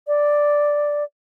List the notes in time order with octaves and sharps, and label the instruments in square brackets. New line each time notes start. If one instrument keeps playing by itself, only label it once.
[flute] D5